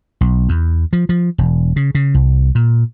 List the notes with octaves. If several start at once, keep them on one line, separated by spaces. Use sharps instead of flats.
B1
E2
F3
F3
E1
C#3
C#3
C2
A#2